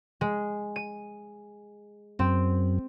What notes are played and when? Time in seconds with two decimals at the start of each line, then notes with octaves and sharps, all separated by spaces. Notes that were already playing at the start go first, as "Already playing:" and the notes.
0.21 G#3
0.76 D#7
2.19 F#2 C4